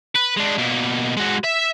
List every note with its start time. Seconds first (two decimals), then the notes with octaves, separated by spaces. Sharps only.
0.15 B4
0.37 G#3 D4
0.58 B2 A#3
1.17 G#3 F#4
1.44 E5